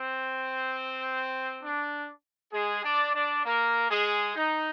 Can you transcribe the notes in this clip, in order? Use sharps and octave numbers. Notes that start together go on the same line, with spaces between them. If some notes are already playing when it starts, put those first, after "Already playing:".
Already playing: C4
D4
G#3 G#4
D4 D5
D4 D5
A#3 A#4
G#3 G#4
D#4